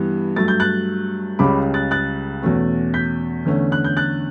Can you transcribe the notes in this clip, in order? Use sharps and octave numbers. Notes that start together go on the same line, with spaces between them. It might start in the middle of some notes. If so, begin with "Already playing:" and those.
Already playing: G2 E3 B3
G2 F#3 A3 A6
G6
F#6 A6
C#2 C#3 G3 C#4 B5 D6
F#6 A6
F#6 A6
E2 B2 A3 C#4
G6 B6
E2 D3 A3 C#4
F#6
G6
F#6 A6